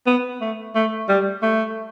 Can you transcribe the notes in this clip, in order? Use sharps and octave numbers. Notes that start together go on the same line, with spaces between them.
B3
A3
A3
G3
A3